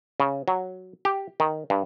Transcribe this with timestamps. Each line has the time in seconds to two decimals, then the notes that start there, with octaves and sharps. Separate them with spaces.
0.20 C#3
0.48 F#3
1.05 G4
1.40 D#3
1.70 G2